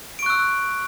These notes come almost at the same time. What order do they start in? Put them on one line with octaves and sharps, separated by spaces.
D7 C#6 F#6 E6